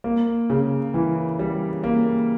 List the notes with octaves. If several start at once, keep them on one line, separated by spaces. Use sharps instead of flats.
A#3
C#3
E3
G3
A#3